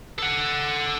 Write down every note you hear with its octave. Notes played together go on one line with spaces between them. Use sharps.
A4 F#5